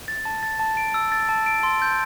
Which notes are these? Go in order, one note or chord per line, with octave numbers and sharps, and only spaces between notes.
A6
A5
A6
A5
D7
E6
A6
A5
D7
C6
G6